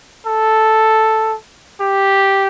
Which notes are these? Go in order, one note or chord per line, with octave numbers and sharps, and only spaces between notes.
A4
G4